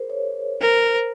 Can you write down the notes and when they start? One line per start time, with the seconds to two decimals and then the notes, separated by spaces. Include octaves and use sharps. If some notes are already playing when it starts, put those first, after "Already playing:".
Already playing: G#4 A#4 C5
0.10 C#5
0.62 A#4 C5